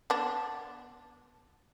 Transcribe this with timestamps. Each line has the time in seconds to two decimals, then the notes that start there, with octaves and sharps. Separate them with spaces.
0.10 B3 D4